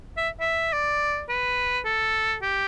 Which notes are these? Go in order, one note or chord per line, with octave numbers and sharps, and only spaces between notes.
E5
E5
D5
B4
A4
G4